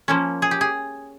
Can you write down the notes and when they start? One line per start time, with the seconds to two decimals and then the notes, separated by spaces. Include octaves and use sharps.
0.08 F3 A#3 C#4
0.42 G#4
0.51 G4
0.61 G#4